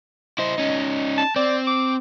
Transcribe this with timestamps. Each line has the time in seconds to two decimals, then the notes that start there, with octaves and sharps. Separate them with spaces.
0.38 E4 C5 D#5
0.58 C#4 D#4
1.18 A5
1.36 C4 D5
1.67 D6